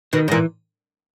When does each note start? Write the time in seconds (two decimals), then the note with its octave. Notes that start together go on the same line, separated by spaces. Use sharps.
0.13 B2 D#3
0.28 G#2
0.32 A#2 E3